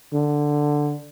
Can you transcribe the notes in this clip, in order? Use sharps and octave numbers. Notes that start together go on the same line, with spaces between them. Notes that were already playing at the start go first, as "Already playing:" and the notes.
D3